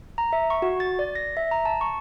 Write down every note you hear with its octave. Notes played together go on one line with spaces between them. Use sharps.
A#5
E5
C#6
F#4
A6
D5
A#6
E5
A#5
A5
C#6